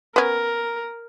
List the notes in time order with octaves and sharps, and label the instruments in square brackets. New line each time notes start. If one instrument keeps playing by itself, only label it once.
[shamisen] B3 C#4 [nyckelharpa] A#4